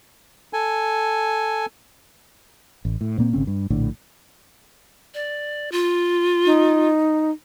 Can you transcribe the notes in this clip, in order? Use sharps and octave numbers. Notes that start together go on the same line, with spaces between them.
A4 G#5
A1
A2
A#2 A#3 C4
G#1 C#3 C4 C#4
G2
A#1 A2 D3
D5
F4
D#4